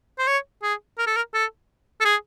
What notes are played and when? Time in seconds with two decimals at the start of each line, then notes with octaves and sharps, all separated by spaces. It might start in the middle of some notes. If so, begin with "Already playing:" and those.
0.18 C5
0.27 C#5
0.63 G#4
0.98 A#4
1.07 A4
1.16 A#4
1.34 A4
2.01 A4
2.05 G#4